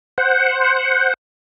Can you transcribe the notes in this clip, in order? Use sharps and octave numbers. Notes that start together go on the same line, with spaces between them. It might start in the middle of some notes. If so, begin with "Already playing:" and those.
C5 F#5